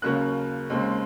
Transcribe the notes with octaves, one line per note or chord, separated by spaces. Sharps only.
D#2 C#3 F#3 A#3 C#4 F#6
D#2 C#3 G#3 C4